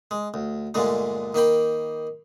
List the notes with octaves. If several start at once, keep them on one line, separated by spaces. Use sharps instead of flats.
G#3
D2
G2 A#2 D3 G#3 A3
D#3 A#3 G5 B5